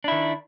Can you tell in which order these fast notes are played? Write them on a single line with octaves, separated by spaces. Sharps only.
D4 E4 D#3